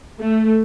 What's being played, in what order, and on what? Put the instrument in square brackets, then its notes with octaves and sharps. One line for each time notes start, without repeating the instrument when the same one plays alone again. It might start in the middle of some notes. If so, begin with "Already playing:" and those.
[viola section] A3